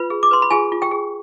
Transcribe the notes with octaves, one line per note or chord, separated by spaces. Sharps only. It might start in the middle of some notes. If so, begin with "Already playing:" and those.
Already playing: F4 B4 B5
G#4
D6
B4 C6
B5
F4 G#4 G#5
F4
G4 G5
G#4